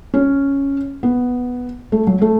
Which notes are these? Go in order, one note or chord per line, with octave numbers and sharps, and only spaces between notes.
C#4
B3
A3
F#3
A3